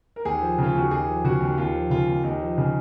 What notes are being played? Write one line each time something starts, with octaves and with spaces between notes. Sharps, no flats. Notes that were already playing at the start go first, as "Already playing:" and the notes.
A#4
D#2 G#4
F3
C#3 F4
D#2 F#4
D#2 G#4
F3
C#3 F#4
D#2
D#2 F4
F3
C#3 F4
D#2
D#2 D#4
F3
C#3